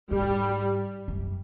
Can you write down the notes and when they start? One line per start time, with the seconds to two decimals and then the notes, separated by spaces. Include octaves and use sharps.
0.11 G#2 G3
1.08 F#2